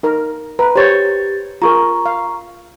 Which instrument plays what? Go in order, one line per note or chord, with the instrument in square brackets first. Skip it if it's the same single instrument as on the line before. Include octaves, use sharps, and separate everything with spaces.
[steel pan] D#4 A#4
[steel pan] B4 [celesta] A#5
[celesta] G4 A6 [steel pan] C5 C#5
[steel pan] F4 G#4 A#4 [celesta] A#5 C#6
[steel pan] F5